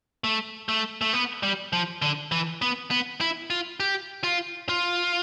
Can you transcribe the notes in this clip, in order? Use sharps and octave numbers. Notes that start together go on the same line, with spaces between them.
A3
A3
A3
B3
G3
F3
D3
E3
B3
B3
E4
F4
G4
F4
F4